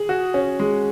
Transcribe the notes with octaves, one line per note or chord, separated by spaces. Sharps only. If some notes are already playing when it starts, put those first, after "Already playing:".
Already playing: G#4
F#4
C#4
G#3